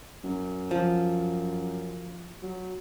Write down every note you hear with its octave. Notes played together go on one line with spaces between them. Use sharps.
F#2
F3
F#3